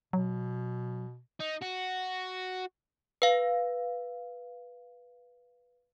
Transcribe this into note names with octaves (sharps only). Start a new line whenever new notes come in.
B2 F#3
D#4
F#4
B4 F5